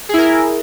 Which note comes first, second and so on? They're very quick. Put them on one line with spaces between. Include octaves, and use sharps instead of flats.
G#4 E4 A#4